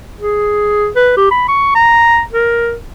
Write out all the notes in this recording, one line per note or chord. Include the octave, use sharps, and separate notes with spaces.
G#4
B4
G4
B5
C#6
A#5
A#4